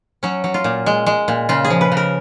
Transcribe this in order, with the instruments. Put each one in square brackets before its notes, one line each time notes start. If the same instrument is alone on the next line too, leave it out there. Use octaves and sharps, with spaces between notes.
[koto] F#3 C#4
F#3
F4
A#2
G#3
G#3
A#2
C#3 F4
G#4
F3
B4
C#3
A#4